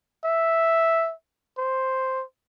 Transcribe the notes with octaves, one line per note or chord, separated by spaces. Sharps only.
E5
C5